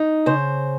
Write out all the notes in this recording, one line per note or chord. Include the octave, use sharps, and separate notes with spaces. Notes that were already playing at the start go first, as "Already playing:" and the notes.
Already playing: D#4
C#3 C5